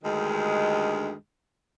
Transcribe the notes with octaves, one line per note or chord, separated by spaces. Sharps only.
D2 G2 D#3 G#3